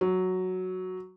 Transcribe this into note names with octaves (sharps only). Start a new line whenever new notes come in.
F#3